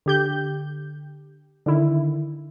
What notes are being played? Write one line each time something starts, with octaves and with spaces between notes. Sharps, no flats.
D3 G4 G6
D3 D#3 E4